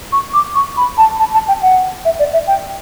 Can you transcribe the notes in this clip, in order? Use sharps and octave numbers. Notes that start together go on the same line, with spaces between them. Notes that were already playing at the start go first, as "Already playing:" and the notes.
C#6
D6
C#6
B5
A5
A5
A5
G5
F#5
E5
D5
E5
G5